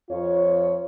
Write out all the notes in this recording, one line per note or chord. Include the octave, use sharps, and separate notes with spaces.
F2 F4 C#5